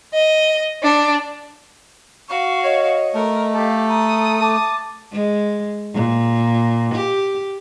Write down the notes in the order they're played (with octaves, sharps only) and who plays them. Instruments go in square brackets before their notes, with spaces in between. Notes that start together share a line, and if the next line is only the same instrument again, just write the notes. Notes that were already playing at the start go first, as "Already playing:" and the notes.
[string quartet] D#5
D4
[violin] F#4 F5 [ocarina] C#6
[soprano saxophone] C#5 [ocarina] D#5
[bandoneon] A3 [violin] A#4
[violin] G4 F5 [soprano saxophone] A4
[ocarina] A#5 [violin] D#6
[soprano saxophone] A5 [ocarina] D6
[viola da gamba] G#3
A#2
G4